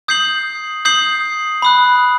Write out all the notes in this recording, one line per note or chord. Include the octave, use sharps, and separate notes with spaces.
D#6 G6 C7 F#7
D#6 G6 C7 F#7
B5 D#6 F#6